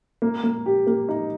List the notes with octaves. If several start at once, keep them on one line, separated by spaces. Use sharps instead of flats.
A#3
A#3
G4
A#3
D#4